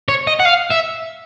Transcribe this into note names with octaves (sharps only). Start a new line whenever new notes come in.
C#5
D#5
F#5
F5
E5